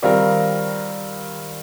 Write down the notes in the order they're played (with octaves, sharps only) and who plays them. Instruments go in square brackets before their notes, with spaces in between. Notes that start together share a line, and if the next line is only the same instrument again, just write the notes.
[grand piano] D#3 G3 C4 F4 A#4